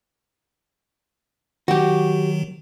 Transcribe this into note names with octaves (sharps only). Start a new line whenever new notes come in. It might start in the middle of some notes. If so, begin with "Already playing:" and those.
D#3 F#3 F#4 G4